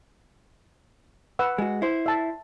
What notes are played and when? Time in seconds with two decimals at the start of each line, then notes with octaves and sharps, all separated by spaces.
1.39 B4 F#5 E6
1.58 G#3 F#4
1.82 E4 C5
2.06 E5 A5